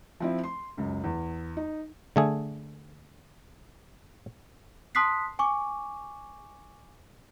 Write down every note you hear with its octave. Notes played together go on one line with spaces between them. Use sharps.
F3 C4 E4
C6
C#2 F#2
E2
D#4
D3 A3 G#4
A5 C6 D#6 F#6 B6 C7
G#5 C#6 D6